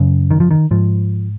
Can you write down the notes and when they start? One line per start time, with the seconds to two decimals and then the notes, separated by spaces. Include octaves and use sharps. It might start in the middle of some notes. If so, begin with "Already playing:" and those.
Already playing: F#2 C#3
0.31 D#3
0.40 F3
0.51 D#3
0.71 G#2 F3